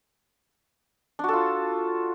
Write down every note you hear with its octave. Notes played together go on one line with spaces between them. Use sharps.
D4 F4 F#4 A4